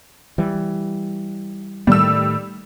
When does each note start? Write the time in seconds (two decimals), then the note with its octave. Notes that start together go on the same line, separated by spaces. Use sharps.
0.38 E3 G3
1.87 A2 D#3 G3 A3 E6